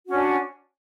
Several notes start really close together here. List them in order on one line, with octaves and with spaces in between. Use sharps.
F#4 C#4 D4